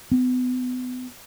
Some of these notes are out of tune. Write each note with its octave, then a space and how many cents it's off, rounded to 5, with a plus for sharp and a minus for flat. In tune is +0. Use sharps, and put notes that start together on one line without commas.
B3 +35